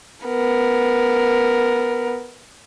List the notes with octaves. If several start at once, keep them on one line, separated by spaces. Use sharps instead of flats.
B3 A#4